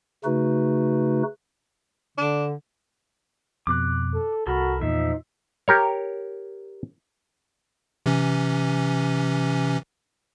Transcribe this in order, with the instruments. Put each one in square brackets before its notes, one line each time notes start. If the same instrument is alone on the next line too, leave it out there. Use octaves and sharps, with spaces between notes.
[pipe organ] C#3 A3 D#4 F#4 B4
[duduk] D3 [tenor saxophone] D4
[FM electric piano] F2 B2 [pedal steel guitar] D6 F#6
[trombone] A4
[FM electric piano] C2 [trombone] F#4 [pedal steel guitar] A4 A#4 B5
[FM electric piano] E2 A#2 [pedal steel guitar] F3 E5 [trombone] D#4
[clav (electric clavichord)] G4 A#4 C#5
[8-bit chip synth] C3 E3 C#4